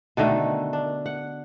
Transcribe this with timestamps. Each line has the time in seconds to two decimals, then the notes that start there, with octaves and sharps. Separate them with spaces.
0.17 B2 D3 D#3 A3
0.73 D4
1.06 F#5